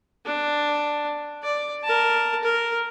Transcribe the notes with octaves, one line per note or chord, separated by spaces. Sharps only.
D4
D5
A#4 A5
A#4